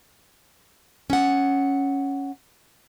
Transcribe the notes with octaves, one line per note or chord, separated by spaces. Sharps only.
C#4 F#5